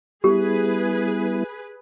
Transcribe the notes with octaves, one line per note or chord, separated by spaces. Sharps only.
G3 B3 E4 G4 G#4 B4